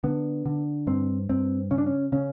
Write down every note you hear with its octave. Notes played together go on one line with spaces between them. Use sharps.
D3 B3
D3
G2 C4
G2 C4
C#3 C#4
D4
C#4
C#3 C#4